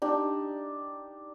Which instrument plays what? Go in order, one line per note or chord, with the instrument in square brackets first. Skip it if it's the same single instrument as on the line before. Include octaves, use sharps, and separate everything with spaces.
[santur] D4 D#4 G4